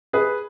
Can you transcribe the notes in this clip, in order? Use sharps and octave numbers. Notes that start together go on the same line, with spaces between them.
G#4 B4